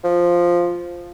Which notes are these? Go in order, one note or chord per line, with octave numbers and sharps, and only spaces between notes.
F3